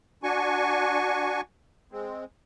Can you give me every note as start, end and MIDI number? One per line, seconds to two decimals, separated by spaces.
0.23 1.41 62
0.23 1.41 66
0.23 1.41 80
0.23 1.41 85
1.92 2.25 56
1.92 2.25 60